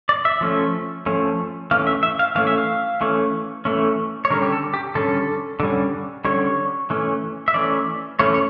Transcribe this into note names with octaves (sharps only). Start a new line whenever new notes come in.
D5
E5
F3 A3 C#4
F3 A3 C#4
E3 A3 C#4 F5
E5
E5
F5
E3 A3 C#4 F5
E5
F5
E3 A3 C#4
E3 A3 C#4
C#5
D3 G3 C#4 A#4
G4
A4
G4
D3 G3 C#4 A4
D3 G3 C#4
D3 G3 C#4 C#5
E3 A3 C#4
E5
E3 A3 C#4 D5
E3 A3 C#4 C#5
C#5